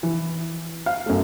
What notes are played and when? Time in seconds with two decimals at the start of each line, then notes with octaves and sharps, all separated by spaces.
0.03 E3
0.86 F5
1.06 F#2 A3